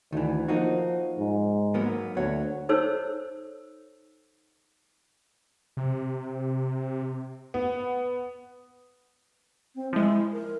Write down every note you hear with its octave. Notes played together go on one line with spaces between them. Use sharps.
D2 D#3 E3
F3 A#3 D#4 F#4
G#2
F#3 A#3 B3
D2 C#5 F#5
D#4 A4 C5 C#5 E6
C3
B3
C4
F3 G#3 E4
A#4